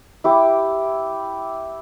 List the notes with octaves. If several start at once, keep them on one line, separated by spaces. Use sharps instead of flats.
E4 G4 D6